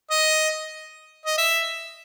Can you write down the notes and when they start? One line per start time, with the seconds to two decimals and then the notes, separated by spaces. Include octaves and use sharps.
0.11 D#5
1.26 D#5
1.38 E5